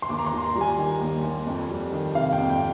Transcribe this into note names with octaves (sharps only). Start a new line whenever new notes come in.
C6
D#2 D6
A#5
C6
D#2
A#5
G3
G#5
D#3
D#2
D#2
F2
G3
D#3
C3 F5
G5
F2
G5